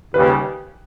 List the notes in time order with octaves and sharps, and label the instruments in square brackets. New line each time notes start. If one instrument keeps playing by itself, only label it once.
[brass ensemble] D#2 C#3 G3 [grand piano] B4